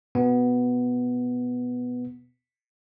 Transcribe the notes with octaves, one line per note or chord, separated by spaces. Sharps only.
B2 B3